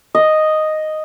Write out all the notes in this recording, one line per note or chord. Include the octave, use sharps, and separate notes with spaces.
D#5